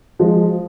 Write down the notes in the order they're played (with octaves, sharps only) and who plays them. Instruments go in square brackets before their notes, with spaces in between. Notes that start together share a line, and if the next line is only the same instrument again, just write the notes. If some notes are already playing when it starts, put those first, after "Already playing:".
[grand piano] F3 G#3